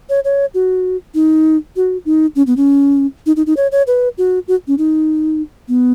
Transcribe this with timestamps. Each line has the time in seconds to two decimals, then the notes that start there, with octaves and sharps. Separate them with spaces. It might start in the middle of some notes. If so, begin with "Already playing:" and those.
0.09 C#5
0.25 C#5
0.54 F#4
1.15 D#4
1.76 F#4
2.05 D#4
2.36 C#4
2.47 B3
2.57 C#4
3.26 D#4
3.36 D#4
3.47 D#4
3.57 C#5
3.72 C#5
3.87 B4
4.18 F#4
4.48 F#4
4.68 C#4
4.78 D#4
5.68 B3